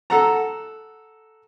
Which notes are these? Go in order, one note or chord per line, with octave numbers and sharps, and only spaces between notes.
A4 F#5 A#5